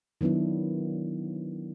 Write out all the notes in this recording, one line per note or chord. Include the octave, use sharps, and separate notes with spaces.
D#3 F#3 B3 D4 E4